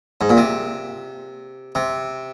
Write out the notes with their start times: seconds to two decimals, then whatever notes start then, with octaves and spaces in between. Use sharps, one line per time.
0.21 G#2
0.30 A#2
0.37 C3
1.75 C3